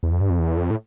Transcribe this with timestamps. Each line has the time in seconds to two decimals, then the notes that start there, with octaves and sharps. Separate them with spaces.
0.03 E2
0.12 F2
0.21 G2
0.30 F2
0.39 E2
0.57 F2
0.70 A2